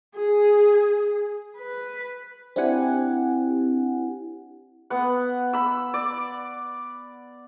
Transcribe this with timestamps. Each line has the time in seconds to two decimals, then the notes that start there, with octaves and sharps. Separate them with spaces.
0.16 G#4
1.58 B4
2.56 C4 D4 E4 G4 F#5 G#5
4.90 B3 F#5
5.53 B5 E6
5.94 D5